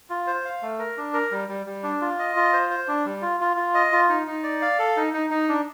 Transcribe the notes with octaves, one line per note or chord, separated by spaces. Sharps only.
F4
C5
F5
A3
A#4
D4
A#4
G3
G3
G3
D4
F4
D#5
F4
C5
C5
D4
G3
F4
F4
F4
D#5
F4
D#4
D#4
D5
F5
A4
D#4
D#4
D#4
D4